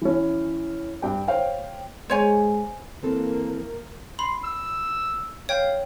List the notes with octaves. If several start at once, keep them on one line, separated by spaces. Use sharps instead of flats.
E3 C#4
G2 G5
C5 C#5 F5 G5
G#3 C5 C#5 G#5
E3 A#3 C4 A4
B5 C6
E6
C#5 F5 G5 G6